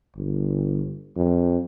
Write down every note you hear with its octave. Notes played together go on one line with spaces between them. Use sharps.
G1
F2